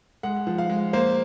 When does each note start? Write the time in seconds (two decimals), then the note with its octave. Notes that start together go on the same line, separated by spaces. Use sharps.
0.23 G#3 F#5
0.47 F3
0.58 F5
0.70 G#3
0.93 A#3 C5